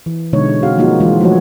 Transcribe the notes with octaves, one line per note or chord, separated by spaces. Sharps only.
E3
B2 D3 G#3 D#4 C#5
C4 F#4 G#4 F5
F3 G3 A#3 D#4 F4 F#4
E3 G#3 F4
F3 F#3 A3 F#4 C#5